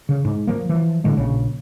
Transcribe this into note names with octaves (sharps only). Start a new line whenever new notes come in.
C#3
G#2
F3 A#3
E3 F3
A2 D3 G#3
A#1 C#3